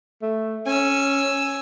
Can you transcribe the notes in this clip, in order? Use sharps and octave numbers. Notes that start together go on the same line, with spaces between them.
A3
C#4 G#5 E6